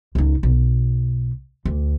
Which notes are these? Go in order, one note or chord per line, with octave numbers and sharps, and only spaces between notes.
C#2 D#4
B1
D2